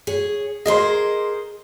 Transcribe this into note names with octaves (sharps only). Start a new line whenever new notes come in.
G#4 C#5
G#4 A#4 C5 D#5 C6